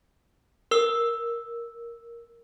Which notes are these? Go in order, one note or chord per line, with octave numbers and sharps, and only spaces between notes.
A#4 E6